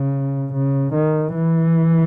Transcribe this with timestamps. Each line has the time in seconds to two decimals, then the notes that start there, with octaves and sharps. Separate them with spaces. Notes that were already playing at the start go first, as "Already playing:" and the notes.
Already playing: C#3
0.53 C#3
0.94 D#3
1.34 E3